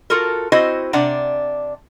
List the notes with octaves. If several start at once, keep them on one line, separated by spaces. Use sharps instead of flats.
F4 F#4 A4 A#4
C4 E4 F#4 C5 D#5
C3 D4 D5 F#5 A#5